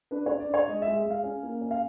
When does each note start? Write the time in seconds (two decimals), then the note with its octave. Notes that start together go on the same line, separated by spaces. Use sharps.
0.11 D4 B4
0.26 D4 C#5
0.40 D5
0.49 D4 C#5
0.68 G#3 D#5
0.82 G#3 E5
0.96 E5
1.05 G#3
1.10 F5
1.24 C#4
1.43 A#3
1.61 C#4
1.71 F5